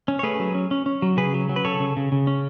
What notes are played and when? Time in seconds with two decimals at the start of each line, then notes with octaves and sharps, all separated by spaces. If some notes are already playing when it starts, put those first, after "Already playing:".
0.08 C#4
0.19 C#5
0.23 A3 G#4 B4
0.40 F#3
0.55 C#4
0.71 C#4
0.86 C#4
1.02 F#3
1.17 C#3 G#4 B4
1.34 F#3
1.49 F#3
1.56 B4
1.65 C#3 A4 C#5
1.80 C#3
1.97 C#3
2.12 C#3
2.27 C#4